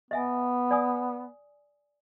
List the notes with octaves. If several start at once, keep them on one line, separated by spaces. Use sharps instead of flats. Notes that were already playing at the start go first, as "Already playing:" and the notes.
B3 D#5 E5 G#5
D5 G#5 D#6